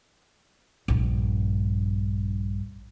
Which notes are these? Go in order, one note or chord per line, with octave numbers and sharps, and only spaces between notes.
A#1 G2